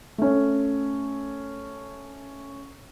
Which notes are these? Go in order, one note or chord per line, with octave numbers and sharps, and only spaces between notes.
A3 C#4